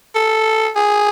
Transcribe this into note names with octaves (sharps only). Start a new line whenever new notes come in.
A4
G#4